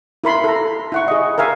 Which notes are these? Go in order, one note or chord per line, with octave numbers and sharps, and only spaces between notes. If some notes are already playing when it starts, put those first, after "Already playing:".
E4 A#4 B5 C6
A4 A#5
E4 F#5 C#6
G#4 D#5
A#4 E5 F5 G#5